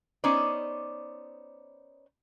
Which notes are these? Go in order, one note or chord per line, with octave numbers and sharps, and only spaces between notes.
B3 C#4 D#4 C5 D5